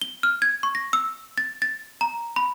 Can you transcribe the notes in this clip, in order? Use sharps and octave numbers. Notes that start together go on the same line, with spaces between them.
G7
F6
G#6
C#6
A#6
E6
A6
A6
A#5
B5